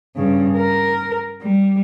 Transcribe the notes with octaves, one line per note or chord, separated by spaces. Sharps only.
G2 C#3
A#4
G3